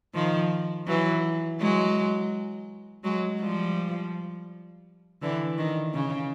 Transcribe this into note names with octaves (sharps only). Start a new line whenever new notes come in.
D#3 F3
E3 F#3
F#3 G#3
F#3 G#3
F3 G3
D3 E3
D#3
C#3